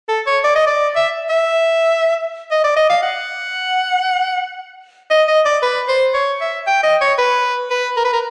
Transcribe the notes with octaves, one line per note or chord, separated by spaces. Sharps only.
A4
C#5
D5
D#5
D5
E5
E5
D#5
D5
D#5
F5
F#5
D#5
D#5
D5
B4
C5
C#5
E5
G5
D#5
C#5
B4
B4
A#4
B4
A#4